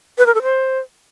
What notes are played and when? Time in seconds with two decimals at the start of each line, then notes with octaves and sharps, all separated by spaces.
0.18 B4
0.26 A#4
0.35 A4
0.43 C5